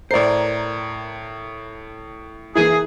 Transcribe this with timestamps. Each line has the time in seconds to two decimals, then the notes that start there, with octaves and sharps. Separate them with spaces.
0.11 A2 A#4 C5 D5 C7
2.55 E3 A#3 E4 G#4